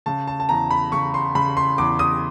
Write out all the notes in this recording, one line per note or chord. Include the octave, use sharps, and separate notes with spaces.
C#3 A5
A5
A5
E2 A#5
B5
C#3 C#6
C6
C#3 B5
C6
E2 D6
D#6